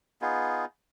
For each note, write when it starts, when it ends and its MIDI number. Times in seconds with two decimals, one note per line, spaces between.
0.22 0.65 59
0.22 0.65 63
0.22 0.65 65
0.22 0.65 68